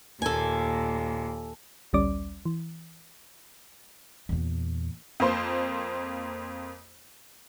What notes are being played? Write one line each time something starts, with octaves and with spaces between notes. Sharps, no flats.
D#2 A#2 A4 G#5
A1 D2 G3 C#4 D5 D6
E3
E2 A#2
F2 A#3 C5 C6